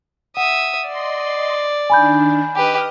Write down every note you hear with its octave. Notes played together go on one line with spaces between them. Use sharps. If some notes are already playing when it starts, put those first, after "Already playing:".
E5 F#5 D#6
D5 D#5 C6
D#3 D4 G#5 B5 G6
G4 B4 D#5 F6